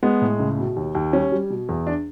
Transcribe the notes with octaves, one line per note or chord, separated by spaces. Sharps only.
G#3 B3
A2
C#2
B2
D#2
D#2
G3 C#4
G3
B2
E2
D4